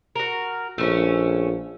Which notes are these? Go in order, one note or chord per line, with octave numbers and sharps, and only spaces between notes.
F#4 A#4
A#1 A3 C4 C#4